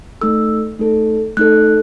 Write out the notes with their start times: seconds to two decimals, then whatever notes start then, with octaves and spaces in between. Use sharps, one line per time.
0.21 A3 D#4 A4 E6
0.79 A3 D#4 A4
1.37 A3 D#4 A4 F#6